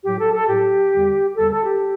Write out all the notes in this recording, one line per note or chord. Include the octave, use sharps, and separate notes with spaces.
A2 F#3 G4
A4
A4
A2 F#3 G4
E2 D3 G3
E2 D3 G3 A4
A4
G4